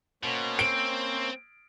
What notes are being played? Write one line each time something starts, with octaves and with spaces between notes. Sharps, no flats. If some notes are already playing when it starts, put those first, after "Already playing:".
B2 A#3 C#4 C5
C4 D7